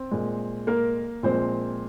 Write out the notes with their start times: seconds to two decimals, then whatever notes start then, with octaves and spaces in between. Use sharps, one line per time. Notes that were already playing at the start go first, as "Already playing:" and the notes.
Already playing: C4
0.11 A#2 G#3
0.67 A#3 A#4
1.23 A#2 F3 G#3 C4 C5